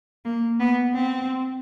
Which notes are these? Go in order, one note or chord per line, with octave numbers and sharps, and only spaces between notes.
A#3
B3
C4